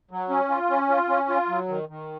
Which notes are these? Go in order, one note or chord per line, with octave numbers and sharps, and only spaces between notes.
F#3
C#4
F4
C#4
F4
C#4
F4
F#3
D#3
D#3